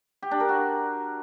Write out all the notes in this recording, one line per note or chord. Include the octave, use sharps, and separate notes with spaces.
G4
D4
A#4
F#4